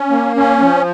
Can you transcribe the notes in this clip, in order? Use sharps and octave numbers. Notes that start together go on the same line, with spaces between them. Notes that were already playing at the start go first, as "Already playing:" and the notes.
Already playing: C#4
A#3
C#4
F3